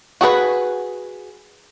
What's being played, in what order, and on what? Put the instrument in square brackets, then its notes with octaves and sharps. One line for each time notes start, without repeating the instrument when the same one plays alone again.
[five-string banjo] F#4 G#4 A4 B4